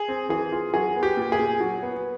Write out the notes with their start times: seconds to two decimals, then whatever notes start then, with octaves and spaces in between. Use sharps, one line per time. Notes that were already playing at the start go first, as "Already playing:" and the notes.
Already playing: G#4
0.08 C4
0.29 E3 G#4
0.52 F4
0.74 F#3 G#4
0.96 B3
1.03 G4
1.17 A#2
1.32 G#4
1.39 A#2
1.60 F#3
1.83 B3